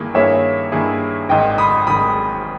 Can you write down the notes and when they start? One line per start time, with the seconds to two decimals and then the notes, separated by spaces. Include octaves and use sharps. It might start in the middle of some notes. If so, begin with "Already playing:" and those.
Already playing: G2 D#3 A#3 E4 G#4
0.15 G2 D#3 A#3 E4 G#4 C#5 E5
0.72 G2 D#3 A#3 E4 G#4
1.29 G#1 G#2 D#3 D#5 G5
1.58 B5 D#6
1.87 G#1 G#2 D#3 B5 D#6